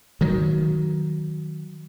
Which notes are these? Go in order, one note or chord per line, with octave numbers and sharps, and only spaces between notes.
D#3 F#3